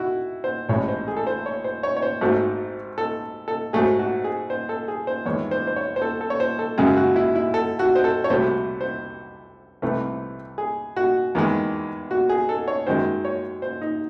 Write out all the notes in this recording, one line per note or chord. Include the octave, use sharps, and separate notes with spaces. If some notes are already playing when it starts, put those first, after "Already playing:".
Already playing: E4 F#4
C5
A1 A2 G#3 C#5
C5
G#4
A4
C5
C#5
C5
C#5
C#5
C5
G#1 G#2 F#3 A3
A4
A4
G#2 F#3 A3 G#4
F#4
G#4
C5
A4
G#4
C5
E2 D#3 G#3 C#5
C5
C5
C#5
C5
A4
A4
C#5
C5
A4
F#2 C#3 G#3 G#4
F#4
E4
E4
A4
F#4
C5
A4
C#5
C2 C3 F#3 A3 C5
C5
C2 C3 E3 A3
G#4
F#4
E2 D#3 G#3
F#4
G#4
A4
C#5
F#2 D#3 G#3 C5
C#5
C5
D#4